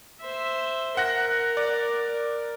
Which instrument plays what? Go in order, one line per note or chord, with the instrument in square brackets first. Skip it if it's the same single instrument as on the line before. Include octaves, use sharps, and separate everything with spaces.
[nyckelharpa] C5 E5
[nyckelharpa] A#4 [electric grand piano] F#5 F#6 A#6
[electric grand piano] D5